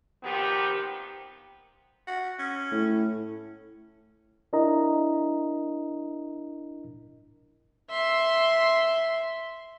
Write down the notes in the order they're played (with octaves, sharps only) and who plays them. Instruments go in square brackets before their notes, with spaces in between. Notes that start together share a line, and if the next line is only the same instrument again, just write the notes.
[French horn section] A#2 D#3 F3 B3 C4 G4
[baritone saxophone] F#4
C#4
[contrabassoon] A2
[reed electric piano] D4 E4 A#4 D#5 A#5
[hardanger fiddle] E5 C6